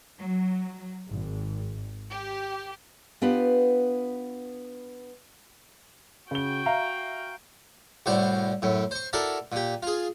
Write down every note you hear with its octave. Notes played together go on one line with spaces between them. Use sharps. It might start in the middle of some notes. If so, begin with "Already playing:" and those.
F#3
G#1
G4
B3 D4 F4 G4 B4
C#3 F#4 G5 G7
E5 F5 A#5
C2 A2 F#4 C5 D5
F#2 A2
C5 C#6
E4 F#4 A4 A#4 D5
A#2 G4
F4 G#4